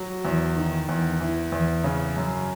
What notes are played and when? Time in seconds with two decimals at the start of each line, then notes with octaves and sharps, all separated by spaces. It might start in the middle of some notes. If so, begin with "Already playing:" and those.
Already playing: F#3
0.25 E2
0.57 D#3
0.89 E2
1.20 E3
1.52 E2
1.84 C#3
2.17 F#2